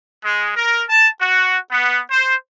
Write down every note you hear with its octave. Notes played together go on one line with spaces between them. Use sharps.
G#3
A#4
A5
F#4
B3
C5